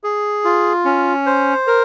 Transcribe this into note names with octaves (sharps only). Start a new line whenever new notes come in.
G#4
F4
C#4
C5
A#4